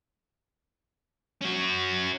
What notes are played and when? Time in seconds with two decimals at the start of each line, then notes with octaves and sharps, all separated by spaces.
1.41 C#4 F#4